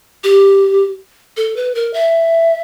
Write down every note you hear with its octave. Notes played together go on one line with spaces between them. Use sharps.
G4
A4
B4
A#4
E5